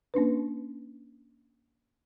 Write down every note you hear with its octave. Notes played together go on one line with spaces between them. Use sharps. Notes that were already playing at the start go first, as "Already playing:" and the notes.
A#3 C#4 D4 B4